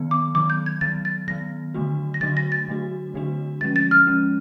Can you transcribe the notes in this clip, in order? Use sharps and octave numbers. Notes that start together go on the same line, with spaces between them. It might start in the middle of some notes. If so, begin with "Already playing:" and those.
Already playing: D#3 F#3 B3
D6
D#3 F#3 B3 D6
G6
G#6
D#3 F#3 B3 A6
A6
D#3 F#3 B3 A#6
D3 F#3 A3 D4 F#4
A#6
D3 F#3 A3 D4 F#4 A6
A#6
A6
D3 F#3 A3 D4 F#4
D3 F#3 A3 D4 F#4
F3 G#3 C#4 A6
A6
F6
F3 G#3 C#4